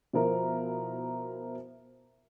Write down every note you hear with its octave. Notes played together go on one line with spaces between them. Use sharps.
B2 F3 E4 A#4